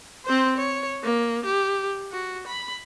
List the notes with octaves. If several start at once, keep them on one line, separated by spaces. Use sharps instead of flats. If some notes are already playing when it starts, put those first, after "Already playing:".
C4 C5
C#5
A#3
G4
F#4
B5